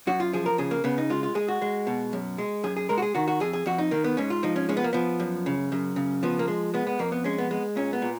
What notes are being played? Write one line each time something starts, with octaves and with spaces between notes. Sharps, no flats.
F#2 F#4
F4
F3 G#4
A#4
C#3 G#4
A#3
C#3 B3
D#4
G#3 F4
F4
G#3 G#4
F#4
G#3
B2
F#2
G#3
F#2 G#4
G#4
G#3 A#4
F#4
G#4
D#3 F#4
F#4
F2 G#4
G#4
F2 F#4
D#4
D#3 A#3
B3
G#2 C#4
F4
F3 D#4
C#4
G#3 C#4
B3
A#3
F3 B3
F#2
C#3
F#2
C#3
F3 B3
A#3
G#3
G#3 B3
B3
F2 A#3
B3
G#3 C#4
B3
G#3 B3
A#2 C#4
B3
A#2